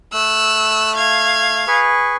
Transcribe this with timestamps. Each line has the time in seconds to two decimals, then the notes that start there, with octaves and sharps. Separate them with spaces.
0.13 A3 E6 F#6
0.96 F5 G#6
1.67 G#4 B4 C#6